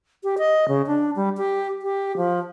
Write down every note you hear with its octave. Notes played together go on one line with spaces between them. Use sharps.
G4
D#5
C#3
D4
G3
G4
G4
F3